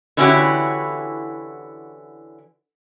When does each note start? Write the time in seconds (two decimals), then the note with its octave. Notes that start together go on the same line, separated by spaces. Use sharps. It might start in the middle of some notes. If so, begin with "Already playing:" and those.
0.17 D3 E3 C#4 E4 F#4 G4